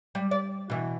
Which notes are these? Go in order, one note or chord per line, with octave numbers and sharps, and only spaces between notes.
G3
D5
B2 E3